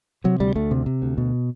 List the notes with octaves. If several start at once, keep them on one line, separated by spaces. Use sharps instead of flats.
C3 F#3
D2 G3
D2 A3
C3
C3
D2
B2